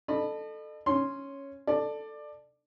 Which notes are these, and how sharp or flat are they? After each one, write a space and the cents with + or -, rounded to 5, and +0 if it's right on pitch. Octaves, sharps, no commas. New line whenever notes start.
A4 +0 D#5 -45 B5 +0
C#4 +0 C6 +0
A4 +5 D5 +20